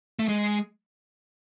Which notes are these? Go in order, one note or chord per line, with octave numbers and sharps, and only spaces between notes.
A3
G#3